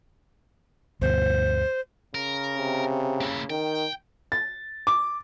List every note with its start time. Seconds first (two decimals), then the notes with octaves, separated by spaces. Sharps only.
1.02 D2 G2 B2 C5
2.15 C#3 A#4
2.58 C3
3.21 A#3 E4
3.50 D#3 G5
4.32 A6
4.87 D6